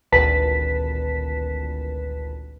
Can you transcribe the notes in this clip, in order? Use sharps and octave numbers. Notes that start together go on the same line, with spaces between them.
G#1 D2 A#2 B4 A5 B6